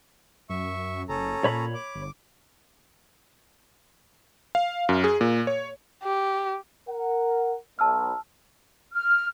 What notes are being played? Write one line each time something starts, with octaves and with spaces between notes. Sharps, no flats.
F#2 E5 C#6
F#1 C#4 A4 A#5
A#2 C#5 B5
D6
G1
F5
F#2
G#4
A#2
C#5
G4
A#4 F#5
B1 A5 E6 F6
F6